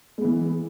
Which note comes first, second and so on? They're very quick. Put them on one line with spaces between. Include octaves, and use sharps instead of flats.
G#3 B3 E3